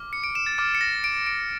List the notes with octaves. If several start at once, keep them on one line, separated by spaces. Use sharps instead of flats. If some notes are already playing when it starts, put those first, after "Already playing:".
Already playing: D6 F6
C#7
D7
E7
A6
D6 F6 A6
C#7
A#6
D7
D7